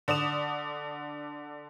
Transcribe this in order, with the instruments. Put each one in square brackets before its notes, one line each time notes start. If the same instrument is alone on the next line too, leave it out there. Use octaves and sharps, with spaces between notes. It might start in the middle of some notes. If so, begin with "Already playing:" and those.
[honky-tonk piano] D3 D5 D#6 E7